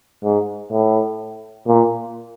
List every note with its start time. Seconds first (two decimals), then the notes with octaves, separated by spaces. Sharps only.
0.24 G#2
0.72 A2
1.67 A#2